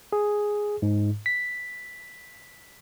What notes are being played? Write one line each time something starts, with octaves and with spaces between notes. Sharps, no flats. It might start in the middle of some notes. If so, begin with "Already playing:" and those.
G#4
G#2
B6